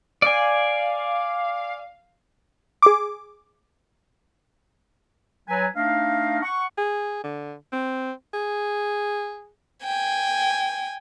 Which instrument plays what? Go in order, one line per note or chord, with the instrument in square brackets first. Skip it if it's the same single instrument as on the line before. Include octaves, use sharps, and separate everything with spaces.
[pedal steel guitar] D5 G#5 [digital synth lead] F5
[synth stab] G#4 D6
[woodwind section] F#3 B4 G#5
A3 D4 D#4 D#5 F5
F#5 C#6
[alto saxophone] G#4
D3
C4
G#4
[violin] G5 G#5